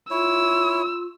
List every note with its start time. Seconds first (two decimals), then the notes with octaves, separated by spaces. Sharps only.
0.11 E4 F4 C#5 E6